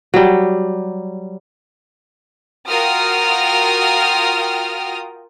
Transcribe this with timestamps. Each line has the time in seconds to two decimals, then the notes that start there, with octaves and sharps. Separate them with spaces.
0.14 F#3 G3
2.68 F4 F#4 A#4 G5 D#6 F6